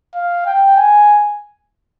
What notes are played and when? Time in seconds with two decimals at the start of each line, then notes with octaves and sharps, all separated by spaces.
0.15 F5
0.46 G5
0.77 G#5